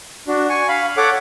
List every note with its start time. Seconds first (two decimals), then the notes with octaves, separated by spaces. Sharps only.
0.27 D4 F#4
0.49 G#5 C#6
0.68 F5 B5
0.97 A4 C#5 F#5 D6